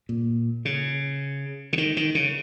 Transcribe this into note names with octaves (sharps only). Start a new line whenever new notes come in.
A#2
C#3
C#3
D#3
D#3
C#3